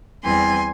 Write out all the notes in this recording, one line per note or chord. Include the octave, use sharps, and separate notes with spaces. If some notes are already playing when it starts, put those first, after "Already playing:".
E2 E3 G3 C4 G#5 C6